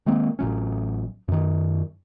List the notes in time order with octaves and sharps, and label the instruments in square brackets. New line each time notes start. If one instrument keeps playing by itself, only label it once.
[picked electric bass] D#3 G#3 A#3 C4
A1 F#3 C#4
F#2 D#3